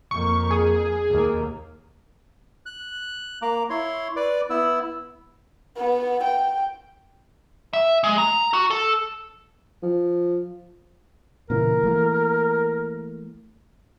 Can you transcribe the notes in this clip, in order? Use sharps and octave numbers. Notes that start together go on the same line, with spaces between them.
F2 A#3 C#6
G#4
D#2 A#3
F#6
A#3 A#5 D6
E4 C#5 C6
B4 D5 D6
B3 E4 E6
B3
G5
E5
G#3
A#5
F#4
A4
F3
A#2 C#3 E3 A#4
E3 A3 A#3